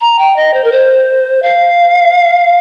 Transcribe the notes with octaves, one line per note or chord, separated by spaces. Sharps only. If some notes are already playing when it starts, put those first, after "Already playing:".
A#5
G5
D#5
C5
A#4
C5
F5